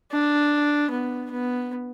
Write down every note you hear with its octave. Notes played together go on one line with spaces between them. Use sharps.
D4
B3
B3